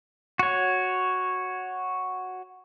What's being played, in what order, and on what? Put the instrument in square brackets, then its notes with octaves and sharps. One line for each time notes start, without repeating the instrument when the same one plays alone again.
[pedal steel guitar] F#4 C#5